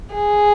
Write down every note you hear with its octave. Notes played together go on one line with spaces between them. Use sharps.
G#4